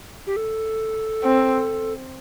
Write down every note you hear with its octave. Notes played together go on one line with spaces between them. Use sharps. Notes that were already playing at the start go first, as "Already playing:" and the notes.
G4
A4
C4